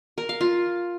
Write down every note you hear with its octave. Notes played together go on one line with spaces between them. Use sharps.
A#4
F5
F4